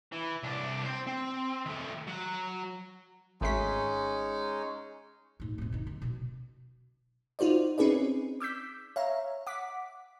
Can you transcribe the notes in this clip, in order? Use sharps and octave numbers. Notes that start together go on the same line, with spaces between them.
E3
C2 D4
C5 G5
C4
D#3 A3
F#3 F#5
G#1 G#3 A3 C#4 D#4 B6
D2 G#2
D#1 C4
D3 D#4
D#3
B2 C#4
D#4 F4 F#4 C5 D5
C4 C#4 D#4 G#4 B4 D5
D6 E6 G6 B6
C#5 E5 F5 A#5
F#5 D6 B6